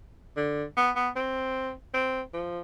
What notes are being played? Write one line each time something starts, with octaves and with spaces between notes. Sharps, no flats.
D3
B3
B3
C4
C4
F3